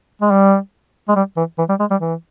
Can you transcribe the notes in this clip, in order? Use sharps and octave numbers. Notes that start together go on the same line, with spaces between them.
G#3
G3
G#3
G3
E3
E3
G3
G#3
G3
E3